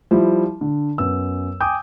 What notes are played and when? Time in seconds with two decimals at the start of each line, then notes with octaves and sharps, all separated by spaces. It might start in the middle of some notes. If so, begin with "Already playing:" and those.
0.11 F3 G3 E4
0.61 D3
0.98 F#2 B3 E6
1.61 G5 G#5 D6 D#6 G6